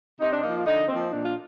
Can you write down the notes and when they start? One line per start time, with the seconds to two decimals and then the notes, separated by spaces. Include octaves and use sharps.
0.19 C3 D#4
0.32 D4
0.42 F3 A#3 D#4
0.55 F4
0.66 D3 D#4
0.88 F3 A#3 C4
1.12 A#2 D4
1.24 F4